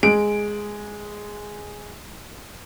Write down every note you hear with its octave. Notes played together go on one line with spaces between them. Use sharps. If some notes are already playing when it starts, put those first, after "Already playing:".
G#3 D7